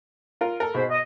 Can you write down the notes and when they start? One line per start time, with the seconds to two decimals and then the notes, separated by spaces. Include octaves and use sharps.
0.41 F4 A#4
0.60 A4 A#4
0.75 G#2 B2 C5 B5
0.90 D#5